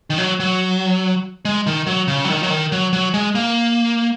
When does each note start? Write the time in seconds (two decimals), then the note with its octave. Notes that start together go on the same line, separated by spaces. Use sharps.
0.10 D#3
0.18 F#3
0.40 F#3
1.45 G#3
1.67 D#3
1.87 F#3
2.08 C#3
2.25 F#3
2.30 D#3
2.43 F#3
2.50 D#3
2.72 F#3
2.93 F#3
3.14 G#3
3.35 A#3